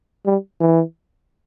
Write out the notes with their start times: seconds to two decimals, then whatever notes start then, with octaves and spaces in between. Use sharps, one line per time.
0.26 G3
0.61 E3